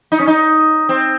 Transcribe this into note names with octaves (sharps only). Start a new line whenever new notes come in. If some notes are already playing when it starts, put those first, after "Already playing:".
D#4
C#4
D#4
C4